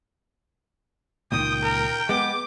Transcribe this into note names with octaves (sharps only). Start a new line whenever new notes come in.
C#2 A#2 D#3 G5 D#6
A#4
G#3 B3 D6